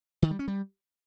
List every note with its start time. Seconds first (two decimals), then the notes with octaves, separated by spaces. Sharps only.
0.22 D#3
0.31 G3
0.39 C#4
0.48 G3